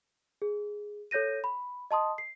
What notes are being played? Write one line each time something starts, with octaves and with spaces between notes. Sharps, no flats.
G#4
A4 C#5 G6 A#6 D#7
B5
D#5 A5 C6 D#6
C7